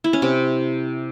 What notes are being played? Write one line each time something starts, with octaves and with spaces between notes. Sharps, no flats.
E4
C#4
C3